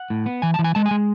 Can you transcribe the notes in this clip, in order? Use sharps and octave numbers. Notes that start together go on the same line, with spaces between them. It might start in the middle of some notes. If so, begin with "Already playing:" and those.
Already playing: F#5
A2
B3
E3 G#5
A5
E3
G#5
G#3 A5
G#5
G#3